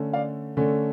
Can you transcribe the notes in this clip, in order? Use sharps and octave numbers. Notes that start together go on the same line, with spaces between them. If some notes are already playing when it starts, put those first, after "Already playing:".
Already playing: D3 A3 C#4
D5 F5
D3 A3 C#4